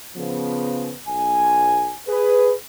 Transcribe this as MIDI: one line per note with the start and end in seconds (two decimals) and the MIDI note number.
0.16 0.92 49
0.16 0.92 53
0.16 0.92 59
1.08 1.95 35
1.08 1.95 80
2.08 2.53 68
2.08 2.53 71